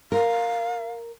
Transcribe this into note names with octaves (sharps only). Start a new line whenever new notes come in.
A#4 F5